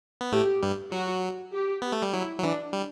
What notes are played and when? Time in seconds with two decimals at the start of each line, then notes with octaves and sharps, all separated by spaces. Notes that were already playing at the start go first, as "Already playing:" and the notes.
0.21 B3
0.32 A2 A3 G4
0.62 G2 G3
0.92 F#3 F#4
1.53 G4
1.82 B3
1.92 A3
2.02 G3
2.13 F#3 E4
2.39 F#3
2.43 E3 D4
2.73 G3